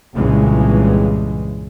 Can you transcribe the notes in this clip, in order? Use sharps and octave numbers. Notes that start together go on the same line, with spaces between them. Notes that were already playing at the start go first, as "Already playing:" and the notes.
C2 G2 A#2 C#3 E3 G#3